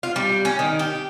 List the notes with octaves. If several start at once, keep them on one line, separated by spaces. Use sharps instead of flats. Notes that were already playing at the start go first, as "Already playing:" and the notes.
F4
G3
C#4
D#3
G4